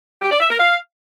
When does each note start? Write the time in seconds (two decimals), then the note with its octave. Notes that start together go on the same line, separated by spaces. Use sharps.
0.22 G4
0.31 D5
0.40 E5
0.49 A#4
0.58 F5